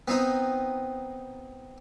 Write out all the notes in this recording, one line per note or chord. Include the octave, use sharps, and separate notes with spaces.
B3 C4 D#4